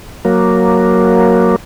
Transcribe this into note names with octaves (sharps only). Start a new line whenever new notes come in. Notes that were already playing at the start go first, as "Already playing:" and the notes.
F#3 A#3